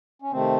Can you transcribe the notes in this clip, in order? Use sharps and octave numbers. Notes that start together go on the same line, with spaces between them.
C#4
C3 D#3 A3 C4